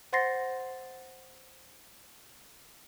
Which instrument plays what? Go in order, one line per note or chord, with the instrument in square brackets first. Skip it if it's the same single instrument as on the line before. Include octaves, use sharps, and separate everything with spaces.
[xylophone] C5 F#5 C6 A6 A#6 C7